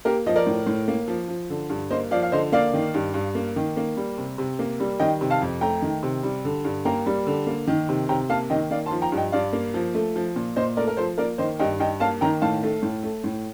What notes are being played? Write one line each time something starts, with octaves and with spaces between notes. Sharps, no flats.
A#3 G4 A#4
F3 D#5
A#4 D5
A2
A2
A#3
F3
F3
D3
G2
A#3 C5 D#5
F3 D5 F5
F5
D3 C5 D#5
A#3 D5 F5
D#3
G2
G2
A#3
D#3
A#3
G3
C3
C3
A#3
G3
D#3 D#5 G5
C3
F5 A5
F2
A3 G5 A#5
D#3
C3
G3
D3
G2
A#3 G5 A#5
G3
D3
A#3
D#3
C3
C3 G5 A#5
A#3 F5 A5
D#3 D#5 G5
A#3 D5 F5
A5 C6
F3
G5 A#5
G2
D#5 G5
G2 D5 F5
A#3
F3
A3
F3
A#2
A#2 C5 D#5
A3 A#4 D5
A#4
F3 A4 C5
A#3 A#4 D5
D#3 C5 D#5
G2 D#5 G5
G2 D#5 G5
A#3 F5 A5
D#3 G5 A#5
A2 F5 A5
A3
A2
A3
A2